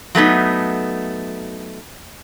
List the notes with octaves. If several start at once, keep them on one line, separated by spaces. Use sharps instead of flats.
F#3 A3 B3 D#4